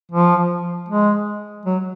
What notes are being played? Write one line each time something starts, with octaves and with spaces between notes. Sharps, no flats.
F3
G#3
F#3